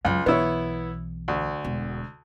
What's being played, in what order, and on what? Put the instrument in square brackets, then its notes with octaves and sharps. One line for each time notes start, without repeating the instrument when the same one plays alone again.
[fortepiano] C#2 [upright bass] F#2 F#3
[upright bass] B1 E3 [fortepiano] B3 E4 C#5
[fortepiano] D2
[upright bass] E1